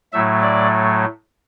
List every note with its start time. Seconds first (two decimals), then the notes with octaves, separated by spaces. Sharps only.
0.13 A2 F#3 A3 E5
0.42 D5